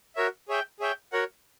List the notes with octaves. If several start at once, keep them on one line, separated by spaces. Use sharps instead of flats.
F#4 A#4 C#5 E5
G#4 C#5 E5 G5
G#4 C#5 E5 G5
F#4 A#4 C#5 F#5